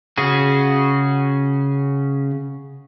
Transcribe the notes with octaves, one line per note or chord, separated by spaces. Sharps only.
C#3 C#4 F#4 G#4